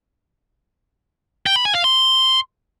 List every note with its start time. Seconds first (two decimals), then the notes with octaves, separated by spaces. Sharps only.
1.46 G5
1.56 B5
1.65 G#5
1.75 F5
1.84 C6